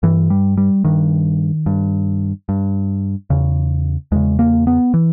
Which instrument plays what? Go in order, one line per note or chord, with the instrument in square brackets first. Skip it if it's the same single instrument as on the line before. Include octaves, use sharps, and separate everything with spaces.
[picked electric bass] G2 E3
G3
G3
G2 D#3
G2
G2
E2 C#3
E2 C#3 G#3
A#3
B3
E3